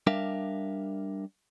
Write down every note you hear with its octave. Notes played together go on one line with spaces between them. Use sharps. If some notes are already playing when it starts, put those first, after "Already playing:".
G3 D4 A#4 E5 F5